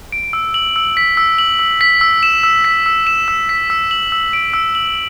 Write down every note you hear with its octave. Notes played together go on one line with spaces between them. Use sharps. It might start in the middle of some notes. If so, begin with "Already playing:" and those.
D7
E6
F#7
E6
B6
E6
F#7
E6
B6
E6
E7
E6
B6
E6
E7
E6
B6
E6
F#7
E6
D7
E6
F#7